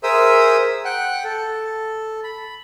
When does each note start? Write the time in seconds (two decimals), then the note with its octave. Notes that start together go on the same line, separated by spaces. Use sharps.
0.03 G#4 A#4 C5 E5 D#6 E6
0.85 F#5 G5
1.24 A4
2.24 B5